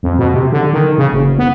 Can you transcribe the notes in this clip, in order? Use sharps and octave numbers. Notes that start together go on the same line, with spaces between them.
F2
B2
C3
D3
D#3
C#3
F#1
B3